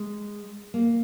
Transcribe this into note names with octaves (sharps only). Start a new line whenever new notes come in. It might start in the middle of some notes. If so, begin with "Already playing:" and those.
Already playing: G#3
A#3